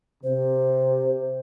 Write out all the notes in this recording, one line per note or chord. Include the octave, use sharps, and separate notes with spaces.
C3 C5